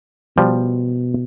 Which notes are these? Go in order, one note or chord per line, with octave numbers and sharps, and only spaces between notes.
B2 F3 G3